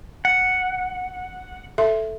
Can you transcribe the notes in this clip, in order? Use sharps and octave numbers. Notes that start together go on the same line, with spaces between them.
F#5
A4 E5 C6